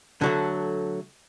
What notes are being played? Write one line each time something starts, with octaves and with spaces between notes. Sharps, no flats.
D3 F#3 A3